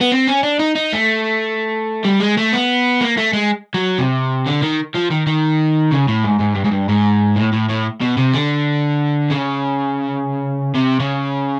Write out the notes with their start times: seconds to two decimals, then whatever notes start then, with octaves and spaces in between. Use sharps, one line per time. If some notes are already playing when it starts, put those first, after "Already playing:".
0.01 B3
0.12 C4
0.27 C#4
0.43 D4
0.59 D#4
0.75 D#4
0.93 A3
2.05 G3
2.20 G#3
2.38 A3
2.53 B3
3.01 A#3
3.17 A3
3.33 G#3
3.74 F#3
3.98 C3
4.46 D3
4.62 D#3
4.94 F3
5.10 D#3
5.27 D#3
5.91 C#3
6.08 A2
6.24 G#2
6.40 G#2
6.55 G2
6.65 G#2
6.72 G2
6.89 G#2
7.36 A2
7.53 A2
7.69 A2
8.01 B2
8.17 C3
8.34 D3
9.30 C#3
10.75 C3
11.00 C#3